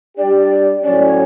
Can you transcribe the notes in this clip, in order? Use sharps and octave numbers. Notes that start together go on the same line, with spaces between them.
G3 D4 G4 D5
A2 F#3 C#4 D5
C#5